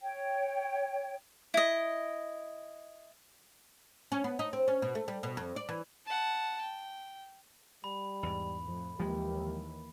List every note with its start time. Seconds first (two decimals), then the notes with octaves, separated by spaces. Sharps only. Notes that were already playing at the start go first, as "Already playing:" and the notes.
0.02 C#5 G5
1.54 E4 D#5
4.12 C#4
4.24 B3
4.39 D#4
4.53 C4
4.68 C#4
4.82 B2
4.95 A3
5.08 G3
5.23 B2
5.37 F2
5.56 D5
5.69 E3
6.06 F#5 A5
6.61 G5
7.84 G3 B5
8.23 E2 G#2 B5
8.63 F2 A2
9.00 D#2 E3 F3 G#3 G4